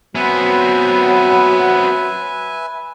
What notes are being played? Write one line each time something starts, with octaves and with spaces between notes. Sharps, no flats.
F#3 B3 C4 B4 E5 G#5